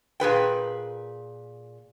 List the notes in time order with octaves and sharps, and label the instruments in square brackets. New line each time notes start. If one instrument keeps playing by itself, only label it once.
[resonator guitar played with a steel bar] A#2 G#4 B4 G5